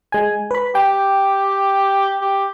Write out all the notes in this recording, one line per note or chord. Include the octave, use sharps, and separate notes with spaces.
G#3 G#5
B4 B5
G4 G5
G4